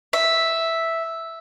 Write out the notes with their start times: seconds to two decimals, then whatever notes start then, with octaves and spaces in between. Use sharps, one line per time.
0.13 E5